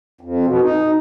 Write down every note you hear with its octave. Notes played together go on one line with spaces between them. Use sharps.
F2
B2
D#4